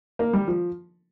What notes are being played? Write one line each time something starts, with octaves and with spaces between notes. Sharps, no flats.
A#3
G3
F3